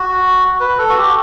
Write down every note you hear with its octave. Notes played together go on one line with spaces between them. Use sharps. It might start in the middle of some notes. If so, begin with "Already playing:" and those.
Already playing: F#4
B4
A4
F#4
G4